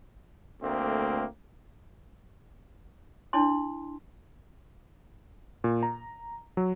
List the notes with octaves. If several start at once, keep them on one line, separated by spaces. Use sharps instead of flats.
D2 A3 A#3 C4
D4 E4 A5 C6
A#2
A#5
F#3